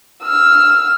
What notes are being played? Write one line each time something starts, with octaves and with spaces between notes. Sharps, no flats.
E6 F6